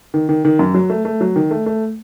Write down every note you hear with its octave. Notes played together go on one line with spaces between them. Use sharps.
D#3
D#3
D#3
F#2
F#3
A3
A3
F#3
D#3
A3
A3